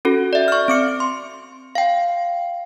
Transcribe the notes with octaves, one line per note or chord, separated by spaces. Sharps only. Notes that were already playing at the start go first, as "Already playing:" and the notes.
C#4 F#4 A4
D5 E5
C#6 F6
C4 D6 C#7
C6
F5 G5